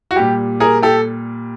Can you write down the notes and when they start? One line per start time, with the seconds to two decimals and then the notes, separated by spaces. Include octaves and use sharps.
0.11 F#4
0.16 A#2 G3 G4
0.60 G#4 A#4
0.83 G4 A4